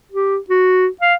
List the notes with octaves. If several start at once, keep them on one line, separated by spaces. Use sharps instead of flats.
G4
F#4
F5